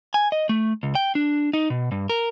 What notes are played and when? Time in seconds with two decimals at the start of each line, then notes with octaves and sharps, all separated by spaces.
0.14 G#5
0.32 D#5
0.49 A3
0.83 C#2
0.95 G5
1.15 D4
1.53 D#4
1.70 B2
1.92 G2
2.10 A#4